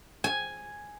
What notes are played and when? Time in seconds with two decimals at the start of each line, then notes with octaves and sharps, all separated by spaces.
0.24 G#5